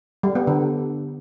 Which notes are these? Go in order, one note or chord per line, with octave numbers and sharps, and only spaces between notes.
G3
B3
D3